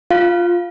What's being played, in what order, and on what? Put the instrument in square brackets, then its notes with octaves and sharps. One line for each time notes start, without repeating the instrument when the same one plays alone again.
[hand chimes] F4 F5